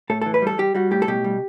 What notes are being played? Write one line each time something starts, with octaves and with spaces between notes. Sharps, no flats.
A2 A4
E3 A4
B4
G3 A4
G3 G4
G3 F#4
A2 G4
A4
B2 G4
G3